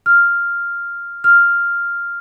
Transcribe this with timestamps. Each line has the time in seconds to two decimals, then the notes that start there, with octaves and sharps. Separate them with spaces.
0.06 F6
1.24 F6